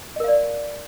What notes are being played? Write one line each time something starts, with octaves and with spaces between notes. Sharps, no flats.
A#4 D5 D#5 F5